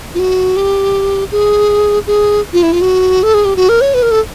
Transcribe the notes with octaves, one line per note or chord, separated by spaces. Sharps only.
F4
F#4
G4
G#4
G#4
F4
E4
F4
F#4
A4
G#4
G4
F#4
A#4
C#5
B4
A#4
A4